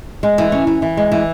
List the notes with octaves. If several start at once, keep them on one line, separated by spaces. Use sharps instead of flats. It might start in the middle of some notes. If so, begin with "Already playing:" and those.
G#3
E3
C#4
E3
E3
G#3
E3